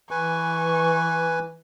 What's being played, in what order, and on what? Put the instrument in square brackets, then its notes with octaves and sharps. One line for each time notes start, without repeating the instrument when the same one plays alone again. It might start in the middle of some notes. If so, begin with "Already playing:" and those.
[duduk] E3 [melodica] B4 G#5 [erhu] C#6